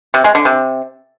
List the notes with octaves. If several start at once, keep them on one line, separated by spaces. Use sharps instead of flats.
C3
G#3
D3
C3